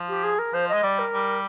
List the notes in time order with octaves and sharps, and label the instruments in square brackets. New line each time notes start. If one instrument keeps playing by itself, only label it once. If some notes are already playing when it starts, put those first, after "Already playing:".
Already playing: [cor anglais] F3
[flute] G4
G#4
A#4
[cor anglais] F3 [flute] C5
[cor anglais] G#3 [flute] D#5
[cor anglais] G3 [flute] D5
[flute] A#4
[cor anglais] G3